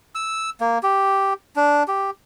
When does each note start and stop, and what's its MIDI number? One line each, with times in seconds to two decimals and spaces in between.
0.15 0.50 88
0.61 0.78 58
0.83 1.33 67
1.56 1.83 62
1.88 2.10 67